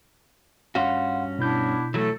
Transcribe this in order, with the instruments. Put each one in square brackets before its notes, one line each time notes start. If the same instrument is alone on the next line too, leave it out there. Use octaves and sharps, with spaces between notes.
[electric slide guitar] G2 C#4 F#4 [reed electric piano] F5 F#5 C6
[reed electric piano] B2 G6 [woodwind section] B3 D4 E4
[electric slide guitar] E3 F#3 [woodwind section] A3 A4